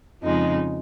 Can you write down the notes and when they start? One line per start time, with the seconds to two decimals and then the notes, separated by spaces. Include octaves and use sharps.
0.23 F2 C#3 F3 G#3 D#4